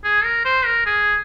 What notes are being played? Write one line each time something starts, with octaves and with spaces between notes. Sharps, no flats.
G#4
A#4
C5
A#4
G#4